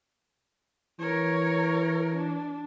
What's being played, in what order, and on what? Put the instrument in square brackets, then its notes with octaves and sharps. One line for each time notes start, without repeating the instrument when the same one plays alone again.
[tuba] E3 [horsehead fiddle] A#4 C#5
[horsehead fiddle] D4